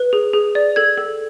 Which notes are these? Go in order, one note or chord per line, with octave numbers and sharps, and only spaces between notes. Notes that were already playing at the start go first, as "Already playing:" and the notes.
Already playing: B4
G#4
G#4
D5
A4 G#6
A4